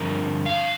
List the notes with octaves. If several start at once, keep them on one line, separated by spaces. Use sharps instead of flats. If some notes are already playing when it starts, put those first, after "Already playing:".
Already playing: G2 D3 F3 C4 A#4
F5